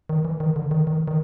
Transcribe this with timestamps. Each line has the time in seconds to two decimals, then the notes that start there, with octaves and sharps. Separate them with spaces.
0.09 D#3
0.25 E3
0.40 D#3
0.56 D3
0.71 D#3
0.87 D#3
0.97 E3
1.08 D#3